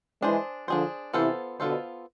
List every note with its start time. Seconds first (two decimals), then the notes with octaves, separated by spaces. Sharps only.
0.22 E3 G#3 D4 G#4 C5
0.68 D3 F3 D4 G#4 C5
1.13 C3 E3 B3 F4 A4 C5
1.59 B2 D3 B3 F4 A4 C5